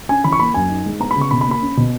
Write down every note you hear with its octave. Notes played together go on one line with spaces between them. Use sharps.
C#4 G#5
E3 B5
C#6
A#3 B5
F#2 G#5
D#4
G#3
B3 A#5
B5
C#3
C#6
B2 B5
B5
A#3
B5
C#4
B2